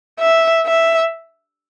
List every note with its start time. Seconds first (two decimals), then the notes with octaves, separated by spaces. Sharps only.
0.20 E5
0.66 E5